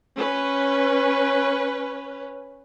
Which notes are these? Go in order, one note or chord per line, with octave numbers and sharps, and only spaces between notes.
C#4 B4